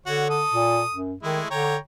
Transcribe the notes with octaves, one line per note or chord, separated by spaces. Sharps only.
D3 F#4 C#5
A4 D#6
A#2
F#2
D#3 G#3 A3 E4
D3 C#5 G5 A#5